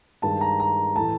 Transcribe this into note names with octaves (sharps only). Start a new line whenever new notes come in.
G2 D#3 G#3 A5
A#5
A#5
A2 E3 A3 A5